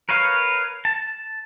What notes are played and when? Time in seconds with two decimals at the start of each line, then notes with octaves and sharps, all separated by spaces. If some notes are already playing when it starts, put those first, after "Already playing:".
0.09 A#4 B4 C#5 F5
0.85 A5